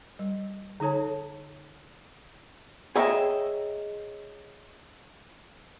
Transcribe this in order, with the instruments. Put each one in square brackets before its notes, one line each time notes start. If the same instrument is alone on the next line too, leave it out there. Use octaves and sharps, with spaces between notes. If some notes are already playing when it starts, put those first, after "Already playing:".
[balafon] G3
D3 D#4 A4 C#5 A5
[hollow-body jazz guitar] G#4 C#5 D#5 E5 G5 A#5